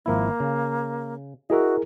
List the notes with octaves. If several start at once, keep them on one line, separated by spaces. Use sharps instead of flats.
G#1 F3 A#3 E4
C#3
E4 F#4 G#4 A#4 D#5 E5